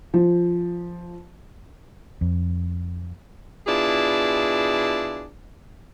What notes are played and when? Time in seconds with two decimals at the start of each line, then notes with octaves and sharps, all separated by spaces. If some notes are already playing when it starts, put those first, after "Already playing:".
0.14 F3
2.21 F2
3.67 B2 D4 E4 F4 G#4